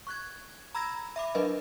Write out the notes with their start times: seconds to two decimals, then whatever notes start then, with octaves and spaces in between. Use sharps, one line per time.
0.07 C#6 F#6 G#6
0.75 A#5 B5 E6 G#6 A#6
1.16 E5 B5 D6
1.35 F#3 D4 A#4 B4 D#5